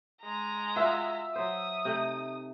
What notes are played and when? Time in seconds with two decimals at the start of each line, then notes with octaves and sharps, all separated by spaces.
0.22 G#3 A#5
0.76 F4 F#4 E5
1.35 F#3 C5 D#6
1.85 C3 A3 D#4